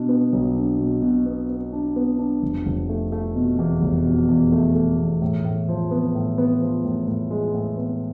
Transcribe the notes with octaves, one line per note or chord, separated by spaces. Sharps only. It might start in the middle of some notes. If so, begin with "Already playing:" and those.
Already playing: B2 D4
B3
B1
D4
B2
B2
B3
B3
D4
B3
D4
F1
F1
A3
A3
B2
E2
F1
B2
E2
A3
A3
E2
A2
A2
F3
B3
A2
B3
F3
A2
A2
G#3
A2
B3